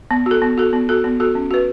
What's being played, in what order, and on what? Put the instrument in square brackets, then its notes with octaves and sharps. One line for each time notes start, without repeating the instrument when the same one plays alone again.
[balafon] B3
F#4 A4
B3
F#4 A4
B3
F#4 A4
B3
F#4 A4
C#4
F#4 B4